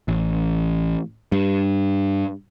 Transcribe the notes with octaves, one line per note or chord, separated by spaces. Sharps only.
A1
G2